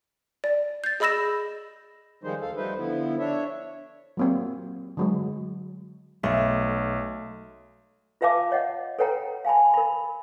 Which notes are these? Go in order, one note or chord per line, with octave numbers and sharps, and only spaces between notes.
D5
G6 A6
G#4 D#5 B5 E6 A#6 E7
D#3 F3 G3 G#3 D#4 C5
D2 A4 F5
F3 G3 A3 D#4 B4 C5
D3 F3 B3 E4
D4 C#5 E5
F#3 A#3 C4
D3 F#3 G#3
B1 A3
F4 B4 E5 F5 A5 D6
C#5 D#5 F#5
A4 B4 C#5 F#5 G5 A#5
F5 G#5 A5 B5
A#4 B5